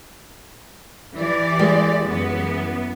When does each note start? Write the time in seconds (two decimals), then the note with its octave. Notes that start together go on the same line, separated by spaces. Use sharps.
1.15 E3 G4 D5
1.59 G3 G#3 A#3
2.04 F#2 E3 B3